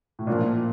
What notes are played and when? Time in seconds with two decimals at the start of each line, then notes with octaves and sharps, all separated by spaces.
0.19 A2
0.27 A#2 F3 A#3 D4